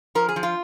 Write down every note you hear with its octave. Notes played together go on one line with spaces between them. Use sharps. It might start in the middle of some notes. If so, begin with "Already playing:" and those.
F3 A#4
G#4
F3
F4